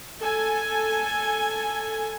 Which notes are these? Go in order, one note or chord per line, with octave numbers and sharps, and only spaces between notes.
A4 G#5